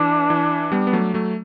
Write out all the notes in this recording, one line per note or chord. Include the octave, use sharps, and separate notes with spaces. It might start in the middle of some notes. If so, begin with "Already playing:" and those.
Already playing: E3 D4
E3
G3 B3
B3
F#3 A3
F#3 A3